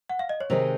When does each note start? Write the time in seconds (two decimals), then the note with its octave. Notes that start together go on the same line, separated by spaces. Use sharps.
0.10 F#5
0.19 F5
0.29 D#5
0.40 C#5
0.50 C3 D#3 G#3 D#4 G#4 C5